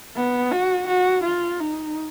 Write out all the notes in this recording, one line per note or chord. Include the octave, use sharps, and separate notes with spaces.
B3
F#4
F#4
F4
D#4